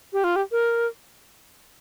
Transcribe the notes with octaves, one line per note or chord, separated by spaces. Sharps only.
G4
F4
G4
A#4